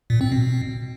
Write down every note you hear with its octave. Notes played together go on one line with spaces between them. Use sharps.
A#2
C4
B2